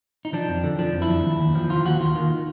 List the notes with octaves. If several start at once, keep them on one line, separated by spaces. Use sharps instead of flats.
D#4
F3 D4
F2
D3
F3 D4
F2
E4
F2
D#2
D#2
F3
D#2 F4
D#2 F#4
D#2 F4
D#3